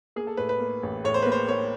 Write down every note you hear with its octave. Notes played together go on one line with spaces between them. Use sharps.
A#3 G#4
A4
A2 B4
B4
A#3
A1
A2 C#5
C5
A#3 B4
C5
A#3 C#5